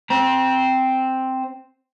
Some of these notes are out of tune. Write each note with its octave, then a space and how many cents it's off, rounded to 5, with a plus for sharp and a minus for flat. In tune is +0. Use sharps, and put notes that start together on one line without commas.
C4 +0 A#5 +45